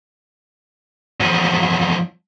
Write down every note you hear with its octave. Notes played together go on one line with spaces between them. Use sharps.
E2 F3